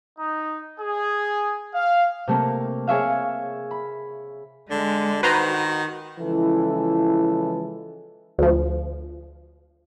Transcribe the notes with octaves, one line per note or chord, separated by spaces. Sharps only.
D#4
G#4
F5
C3 A3 A#3
G#4 C#5 E5 F5
B5
D3 G#3
D#3 F#4 B4 C5 A#5
C#3 E3 F3 G#3 E4 A4
D2 F3